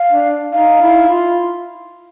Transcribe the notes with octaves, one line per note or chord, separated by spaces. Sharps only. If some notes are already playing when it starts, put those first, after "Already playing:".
Already playing: F5
D4
D#4 F5
E4
F4